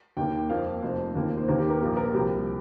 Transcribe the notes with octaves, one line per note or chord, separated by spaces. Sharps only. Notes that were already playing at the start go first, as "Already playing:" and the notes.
D#2 D#3 A#3 G5
F2 F3 A#3 F5
F1 F2 F3 C5
D#2 D#3 A#3
C5
D#2 D#3 A#3 A#4
G4
A#4
A#1 A#2 A#3 G4
A#4
C2 C3 F3 A#3 G4